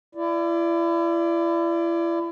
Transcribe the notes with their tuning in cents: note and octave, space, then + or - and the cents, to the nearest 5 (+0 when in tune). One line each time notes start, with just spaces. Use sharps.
E4 +35 D5 +0